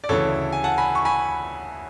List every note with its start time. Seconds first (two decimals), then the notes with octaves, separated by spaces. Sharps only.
0.04 D5
0.09 D2 C#3 E3 A4 C#5
0.52 G#5
0.64 F#5 A5
0.78 G#5 B5
0.95 C#6
1.05 G#5 B5